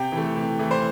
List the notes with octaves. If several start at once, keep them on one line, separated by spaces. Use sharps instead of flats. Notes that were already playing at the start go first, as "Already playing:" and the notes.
Already playing: C3 G5
E3 A3
C3
E3 A3
C5